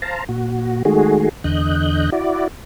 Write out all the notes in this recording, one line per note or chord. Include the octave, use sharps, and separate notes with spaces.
C5 F5 A5 A#5
A#2 F#4
D#3 G#3 A3 F#4 G#4
E2 D3 D#5 F#6 G6
E4 F#4 D5